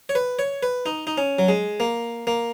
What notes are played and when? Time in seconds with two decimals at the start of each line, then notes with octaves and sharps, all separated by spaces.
0.09 C#5
0.15 B4
0.39 C#5
0.63 B4
0.86 D#4
1.07 D#4
1.18 C#4
1.39 F#3
1.48 G#3
1.80 A#3
2.27 A#3